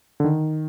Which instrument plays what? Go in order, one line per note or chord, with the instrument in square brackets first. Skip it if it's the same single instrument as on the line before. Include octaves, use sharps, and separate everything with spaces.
[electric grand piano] D3
D#3